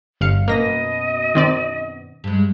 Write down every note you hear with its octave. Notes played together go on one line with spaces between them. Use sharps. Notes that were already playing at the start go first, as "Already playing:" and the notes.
G1 E2 F5 C#7
F#2 B2 A#3 B4 D#5 A#6
D#3 C4 D5
G2 G#3